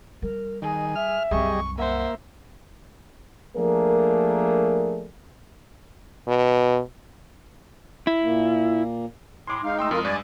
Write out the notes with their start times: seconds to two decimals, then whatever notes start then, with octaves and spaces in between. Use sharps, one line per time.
0.22 G3 A#4
0.62 D#3 G#4 D#5
0.95 E5 F6
1.31 C2 F#2 G3 G#4 D#5 C#6
1.78 A#3 C5 E5 F#5
3.57 F3 A3 A#3 D4 G#4 A#4
6.28 B2
8.07 E4
8.23 A#2 A#3
9.47 A2 G#3 C6 D6
9.63 G#3 D#4 F5
9.79 A3 D#5 G5 C6 E6
9.91 F2 G#3 F4 A#4 D#6
10.05 G2 D5 G#5